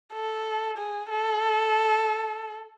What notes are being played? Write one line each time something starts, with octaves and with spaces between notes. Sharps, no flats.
A4
G#4
A4